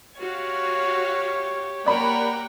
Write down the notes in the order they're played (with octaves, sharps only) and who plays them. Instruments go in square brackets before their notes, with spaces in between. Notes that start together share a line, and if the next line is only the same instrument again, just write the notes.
[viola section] F#4 F5 [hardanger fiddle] G4 [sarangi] C#5
[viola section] A#3 G4 F#5 [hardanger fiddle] A#4 G5 [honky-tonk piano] D5 B5